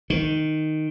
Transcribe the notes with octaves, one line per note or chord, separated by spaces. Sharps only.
D#3